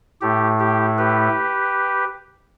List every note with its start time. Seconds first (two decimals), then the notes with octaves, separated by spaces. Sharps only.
0.21 A2 A3 G4
0.60 G4
0.98 G4 B4